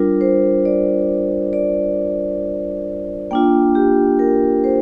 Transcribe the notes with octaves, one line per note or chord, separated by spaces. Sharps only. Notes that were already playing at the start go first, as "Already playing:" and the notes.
Already playing: G3 D4 F4 A#4
C5
D5
D5
A#3 D4 F4 G5
G4
A#4
C5